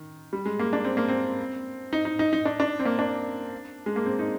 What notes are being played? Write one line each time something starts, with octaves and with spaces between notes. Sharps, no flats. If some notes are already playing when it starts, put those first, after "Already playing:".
Already playing: D#3
G3
G#3
A#3
D4
C4
A#3
C4
D#4
D#4
D#4
D#4
D4
D4
C4
A#3
D4
G#3
A#3
C4
D#4